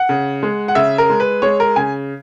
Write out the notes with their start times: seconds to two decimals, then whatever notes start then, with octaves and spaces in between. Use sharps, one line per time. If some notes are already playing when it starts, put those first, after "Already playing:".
Already playing: F#5
0.09 C#3
0.43 G#3
0.68 F#5
0.75 C#3 E5
0.98 A#4
1.10 G#3
1.20 B4
1.42 G#3 C#5
1.60 A#4
1.76 C#3 G#5